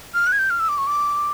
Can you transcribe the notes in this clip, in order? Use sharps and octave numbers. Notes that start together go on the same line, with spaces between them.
F6
F#6
G#6
G6
F6
E6
D6
C#6
D6